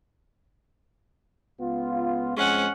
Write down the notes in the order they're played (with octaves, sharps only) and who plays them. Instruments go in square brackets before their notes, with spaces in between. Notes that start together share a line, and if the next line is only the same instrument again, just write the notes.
[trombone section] C#2 B3 F4
[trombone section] F2 G#3 C4 [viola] C#4 F#5